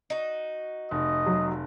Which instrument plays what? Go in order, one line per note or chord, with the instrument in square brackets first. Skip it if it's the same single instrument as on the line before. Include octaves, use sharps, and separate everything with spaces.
[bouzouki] D#4 F#4
[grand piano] F1 [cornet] D#5
[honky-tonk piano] F#3